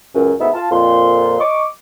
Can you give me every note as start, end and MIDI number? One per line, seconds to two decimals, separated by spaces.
0.14 0.32 37
0.14 0.32 42
0.40 0.49 38
0.40 0.49 44
0.40 0.49 59
0.40 0.49 63
0.40 0.49 76
0.54 0.70 65
0.54 0.70 77
0.54 0.70 81
0.71 1.38 41
0.71 1.38 46
0.71 1.38 65
0.71 1.38 84
1.39 1.64 75
1.39 1.64 85
1.39 1.64 86